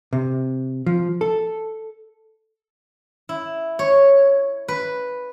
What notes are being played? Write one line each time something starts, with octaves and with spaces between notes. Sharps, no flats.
C3
F3
A4
E4
C#5
B4